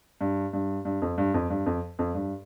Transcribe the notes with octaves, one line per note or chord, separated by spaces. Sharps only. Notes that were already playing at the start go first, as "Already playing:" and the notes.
G2
G2
G2
F2
G2
F2
G2
F2
F2
G2